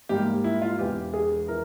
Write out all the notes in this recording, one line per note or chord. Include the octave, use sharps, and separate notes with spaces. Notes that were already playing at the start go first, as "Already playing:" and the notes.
G#2 G3 A#3 G4
E4
F4
E1 E2 E3 G4
G#4
E3 A#4